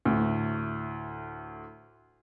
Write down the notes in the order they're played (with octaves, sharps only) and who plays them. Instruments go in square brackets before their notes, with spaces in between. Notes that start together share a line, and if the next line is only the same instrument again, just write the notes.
[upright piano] D2 A2